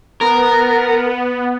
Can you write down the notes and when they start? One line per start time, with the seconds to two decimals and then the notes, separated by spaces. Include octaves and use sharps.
0.21 B3 A#4